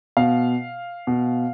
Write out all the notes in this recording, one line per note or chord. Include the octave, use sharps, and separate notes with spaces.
B2 F5
B2